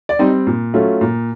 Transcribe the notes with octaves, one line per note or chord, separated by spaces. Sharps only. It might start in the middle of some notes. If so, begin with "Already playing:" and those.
D5
G3 C4 D#4 D#5
A#2
F#3 A3 C#4 F4
A#2